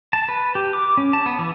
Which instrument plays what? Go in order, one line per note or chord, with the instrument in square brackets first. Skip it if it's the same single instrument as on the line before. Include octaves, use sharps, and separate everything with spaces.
[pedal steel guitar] A5
B4
G4
D6
C#4
A5
B3
E3